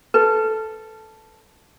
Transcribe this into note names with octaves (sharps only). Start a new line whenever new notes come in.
A4 B4